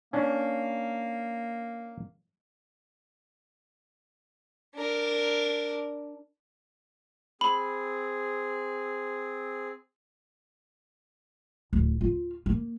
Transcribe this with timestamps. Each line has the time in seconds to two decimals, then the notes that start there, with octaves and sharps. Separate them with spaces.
0.13 A#3 C#4 D4
4.75 D4 A#4
7.41 C4 G#4 B5
11.73 D1
12.01 F4
12.46 A#3